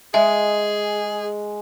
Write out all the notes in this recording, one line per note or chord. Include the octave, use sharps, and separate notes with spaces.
G#3 G#4 E5